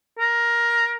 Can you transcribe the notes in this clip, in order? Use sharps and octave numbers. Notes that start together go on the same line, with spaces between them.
A#4